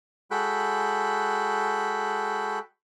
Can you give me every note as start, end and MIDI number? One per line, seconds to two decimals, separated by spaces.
0.31 2.59 56
0.31 2.59 66
0.31 2.59 69
0.31 2.59 79
0.31 2.59 83
0.31 2.59 90